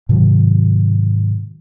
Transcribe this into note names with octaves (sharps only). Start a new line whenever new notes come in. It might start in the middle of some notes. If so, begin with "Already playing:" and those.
G#2 C3 D#3 F#3